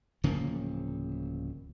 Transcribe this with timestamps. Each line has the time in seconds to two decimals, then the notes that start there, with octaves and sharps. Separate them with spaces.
0.24 D1 C#3 F3 A#3